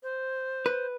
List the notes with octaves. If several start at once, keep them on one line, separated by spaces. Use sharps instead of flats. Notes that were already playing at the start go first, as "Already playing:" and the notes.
C5
B4